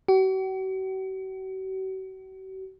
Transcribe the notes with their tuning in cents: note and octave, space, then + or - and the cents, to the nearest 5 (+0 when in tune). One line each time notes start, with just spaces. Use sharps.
F#4 +45